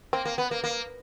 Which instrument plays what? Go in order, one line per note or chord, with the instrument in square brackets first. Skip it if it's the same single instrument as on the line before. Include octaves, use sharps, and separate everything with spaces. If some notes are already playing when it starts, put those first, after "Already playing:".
[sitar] A#3 [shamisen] C4
[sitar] A#3
B3
A#3
A#3